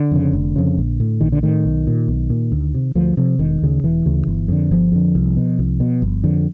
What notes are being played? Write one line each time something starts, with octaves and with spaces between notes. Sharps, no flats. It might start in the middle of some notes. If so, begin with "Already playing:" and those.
Already playing: D3
F2 C#3
F1
F2 C#3
A#1
A2
A#1 D#3
D3
A2 D#3
B1
A#2
B1
A#2
D2
C3
D2 F3
C3 F3
E1 D#3
D2 C#3
E1 E3
D2 C#3
G1
F2 D3
G1 F3
F2 D3
C2
B2
C2
B2
G1
F2 D3